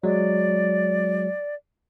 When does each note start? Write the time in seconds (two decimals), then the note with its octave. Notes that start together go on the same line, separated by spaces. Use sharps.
0.03 F#3 G#3 D5